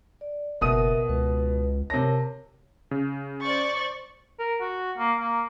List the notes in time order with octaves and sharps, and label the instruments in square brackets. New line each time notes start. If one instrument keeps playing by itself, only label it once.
[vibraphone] D5
[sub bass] F#1 [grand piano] B2 D#6 D#7 [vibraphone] A#4 E5
[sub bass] C#2 [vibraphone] B4
[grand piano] C3 A#6 [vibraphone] A#4 C#5 A5
[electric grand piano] C#3
[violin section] C5 D5 A6 [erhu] C#6
[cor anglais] A#4
F#4
A#3
A#3